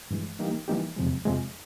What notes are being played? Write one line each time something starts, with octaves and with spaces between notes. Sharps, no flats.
G2 E3 G#3
E3 G3 A#3 D#4 G4
E3 G3 A#3 D#4 G4
F2 C3 F3 G#3
F2 C3 F3 G#3